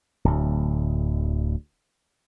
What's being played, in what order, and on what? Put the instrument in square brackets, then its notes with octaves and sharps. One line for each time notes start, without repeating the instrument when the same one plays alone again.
[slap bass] D1 D2